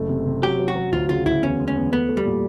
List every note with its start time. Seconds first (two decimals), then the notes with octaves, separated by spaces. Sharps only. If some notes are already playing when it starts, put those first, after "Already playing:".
Already playing: F#1 A3
0.09 C3
0.26 C3
0.42 F#3 G4
0.59 F#3
0.68 F#4
0.76 F#3
0.92 D2 F4
1.09 C#3 F4
1.25 D2 E4
1.43 E2 C#4
1.60 G#3
1.68 C#4
1.76 E2
1.92 A3 B3
2.09 A3
2.17 G3
2.25 A#2